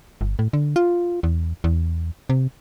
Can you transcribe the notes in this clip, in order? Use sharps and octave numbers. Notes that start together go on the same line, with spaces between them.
G1
A2
D3
F4
E2
E2
C3